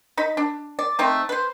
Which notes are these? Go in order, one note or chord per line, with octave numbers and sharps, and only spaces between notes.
D#4 B5
D4
D5
A3 C4 D#4
B4 C5